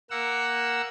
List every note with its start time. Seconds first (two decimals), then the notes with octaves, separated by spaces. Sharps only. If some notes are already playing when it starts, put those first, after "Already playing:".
0.10 A#3 F#5 E6